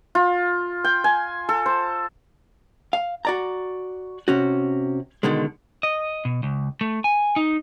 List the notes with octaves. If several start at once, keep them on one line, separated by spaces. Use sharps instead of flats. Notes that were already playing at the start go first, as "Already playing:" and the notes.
F4
G5
G#5
A4
C5
F5
F#4 D5 A#5
C3 C#4 F#4
B2 D3 D#3 G#3
D#5
B2
C#2
A3
G#5
D#4